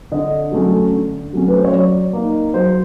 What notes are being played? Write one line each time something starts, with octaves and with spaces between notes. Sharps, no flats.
D3 D#5
F#3 A3 C#4
D3
F#3 A3 C#4
B4
C5
C#5
F#3 D5
A#3 D#4
F#3 C5